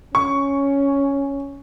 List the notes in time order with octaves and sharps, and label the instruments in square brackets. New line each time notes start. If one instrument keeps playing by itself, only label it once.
[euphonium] C#4 [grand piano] C#6